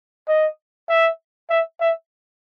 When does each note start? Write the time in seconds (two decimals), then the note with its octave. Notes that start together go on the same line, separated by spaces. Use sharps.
0.28 D#5
0.89 E5
1.50 E5
1.80 E5